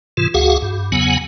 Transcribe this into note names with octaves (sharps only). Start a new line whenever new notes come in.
G#2 C3 E3 F4
D2 F#4 G#4 F5 F#5
G2
E2 C#3 F#3 B3 F#5 G#5